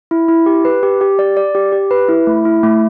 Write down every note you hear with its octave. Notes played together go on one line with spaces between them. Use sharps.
E4
E4
G4
B4
G4
G4
D5
D5
G4
G4
B4
E4
A3
E4
A3